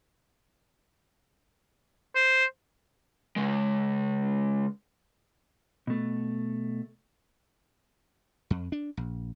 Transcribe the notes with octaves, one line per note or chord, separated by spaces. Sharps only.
C5
C#3 G#3
B2 A3
F2
D4
A#1